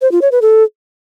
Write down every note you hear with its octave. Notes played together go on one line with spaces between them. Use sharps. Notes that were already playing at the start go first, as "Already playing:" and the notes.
C5
F4
C#5
B4
A4